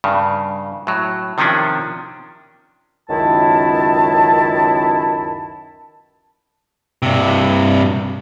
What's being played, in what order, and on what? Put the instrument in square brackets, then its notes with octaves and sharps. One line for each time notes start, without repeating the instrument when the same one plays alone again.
[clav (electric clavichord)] G2 C#3
A2 F#3
C3 D#3 F3 C#4 D4
[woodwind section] C#2 F#2 D#3 E4 A5
[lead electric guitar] G2 C3